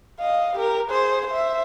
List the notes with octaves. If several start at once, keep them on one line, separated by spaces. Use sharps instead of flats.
D#5 F5
G4 A#4
G#4 C5
C5 E5